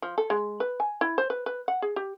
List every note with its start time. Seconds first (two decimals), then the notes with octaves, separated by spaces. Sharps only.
0.02 F3
0.18 A4
0.30 G#3
0.60 B4
0.80 G#5
1.01 E4
1.18 C5
1.30 B4
1.46 B4
1.68 F#5
1.82 G#4
1.96 G4